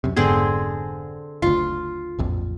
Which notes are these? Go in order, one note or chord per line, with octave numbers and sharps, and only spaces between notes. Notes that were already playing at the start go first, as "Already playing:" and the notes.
F#2 C3
F1 G#2 D3 B3 C4 G#4
F#1 D2 F4
D1 A#1 F2